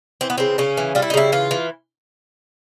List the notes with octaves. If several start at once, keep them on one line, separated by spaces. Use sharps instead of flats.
E3 C4
B3
C#3 C4
C#3 C#4
E3
G3 F4
E4
D#4
C#3 E4
E3 F4
E3